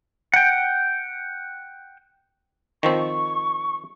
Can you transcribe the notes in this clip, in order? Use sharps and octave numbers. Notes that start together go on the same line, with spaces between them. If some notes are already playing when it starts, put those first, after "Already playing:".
F#5 G5
D#3 F3 C4 C#6